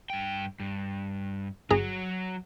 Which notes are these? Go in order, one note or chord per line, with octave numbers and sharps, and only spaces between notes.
G2 G5
G2
G1 F#3 F#4 G#4 A#5